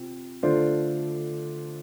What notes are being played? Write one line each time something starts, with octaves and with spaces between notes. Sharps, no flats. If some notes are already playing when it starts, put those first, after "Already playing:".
Already playing: C3 C4 F4
D3 A3 D4 F4 C5